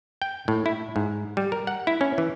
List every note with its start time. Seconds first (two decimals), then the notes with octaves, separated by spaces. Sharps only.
0.22 G5
0.48 A2
0.66 E4
0.96 G#2
1.37 G3
1.52 A#4
1.67 F#5
1.87 E4
2.01 C#4
2.18 E3